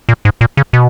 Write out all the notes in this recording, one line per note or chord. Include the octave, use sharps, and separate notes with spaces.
A#2
G#2
A#2
C#3
B2